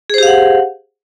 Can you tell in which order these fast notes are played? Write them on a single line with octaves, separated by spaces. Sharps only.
G#4 C5 G4 F5 F#5